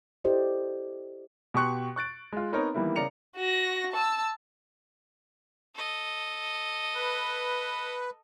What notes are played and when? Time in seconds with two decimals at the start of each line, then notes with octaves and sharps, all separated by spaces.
0.24 E4 G4 A4 C5 D5 D#5
1.54 B2 G4 C6 C#6 F#6 C#7
1.96 C#6 F#6 A6 D7
2.32 G#3 F4
2.52 B3 C4 D#4 A#4 C#5 A#5
2.74 D#3 E3 G3 A#3 B3 E4
2.96 C#3 A#4 D5 A#5 C#7 F7
3.37 F#4 A#6
3.92 A5 E6
5.75 A4 D#5
6.95 B4